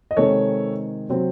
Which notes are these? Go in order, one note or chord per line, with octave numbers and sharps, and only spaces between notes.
D#5
C3 D#3 G#3 C4 A4 C#5
C3 F#3 C4